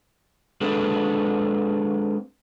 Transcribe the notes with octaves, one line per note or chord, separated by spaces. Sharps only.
G#3 C4 D4 G#4 A4 B4